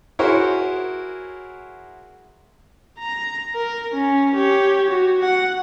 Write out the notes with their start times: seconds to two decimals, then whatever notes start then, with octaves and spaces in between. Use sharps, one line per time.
0.19 E4 F#4 G#4 A#4 C5 C#5
2.99 A#5
3.56 A#4
3.93 C#4
4.34 G4 C#5
4.91 F#4
5.22 F#5